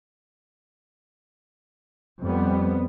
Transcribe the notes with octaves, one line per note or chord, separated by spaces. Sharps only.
F2 G3 B3